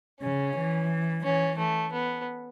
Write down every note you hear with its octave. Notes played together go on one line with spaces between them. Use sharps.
C#3 C#4
E3
E3 C#4
A3
B3